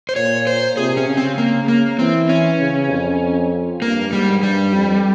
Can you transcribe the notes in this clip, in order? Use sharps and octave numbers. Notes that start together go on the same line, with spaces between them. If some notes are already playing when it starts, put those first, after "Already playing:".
C5
A#2 C#5
C5
C3 G#4
C#4
C#3
C4
A#3
A#3
E3 C4
C#4
C#3
F2
G2 A#3
G#2 G3
G2 G3
F2